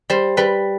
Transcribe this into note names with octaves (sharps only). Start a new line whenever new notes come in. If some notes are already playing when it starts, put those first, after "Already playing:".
G3 C5
G3 B4